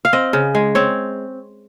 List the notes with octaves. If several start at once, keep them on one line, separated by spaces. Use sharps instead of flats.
F5
C4 D#5
C#3
G#3
C4 C#5